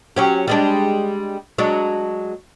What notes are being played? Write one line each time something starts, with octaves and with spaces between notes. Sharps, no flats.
F#3 C#4 G4
G3 G#3 D4
F#3 G#3 D4